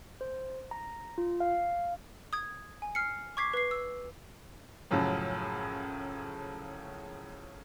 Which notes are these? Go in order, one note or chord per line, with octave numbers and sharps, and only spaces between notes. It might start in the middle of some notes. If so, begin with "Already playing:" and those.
C5
A#5
F4
F5
D#6 G#6
G#5
F6 C7 C#7
C#6 D6 G#6 B6 C7
B4 C7
E6
F#2 A2 C#3 F3 F#3